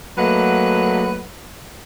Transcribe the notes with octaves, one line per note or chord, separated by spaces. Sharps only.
F#3 A3 A#3 B4 D#5 F#5